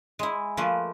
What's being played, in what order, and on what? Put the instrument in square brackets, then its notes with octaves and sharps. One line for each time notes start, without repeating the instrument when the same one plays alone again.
[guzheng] G#3 E4
F3 A3 A#3 B4